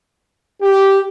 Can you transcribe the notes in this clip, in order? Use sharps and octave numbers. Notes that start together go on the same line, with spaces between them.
G4